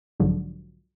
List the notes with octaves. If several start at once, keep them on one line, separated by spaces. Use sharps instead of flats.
B1 G#2 D3 F3 F#3